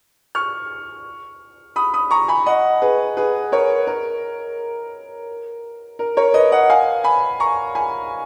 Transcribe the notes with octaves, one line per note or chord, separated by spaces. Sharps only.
C#6 F6
B5 D#6
B5 D#6
A#5 C#6
G#5 B5
D#5 F#5
G#4 B4
G#4 B4
A#4 C#5
A#4
A#4
A#4 C#5
B4 D#5
D#5 F#5
F5 G#5
G#5 B5
A#5 C#6
G#5 B5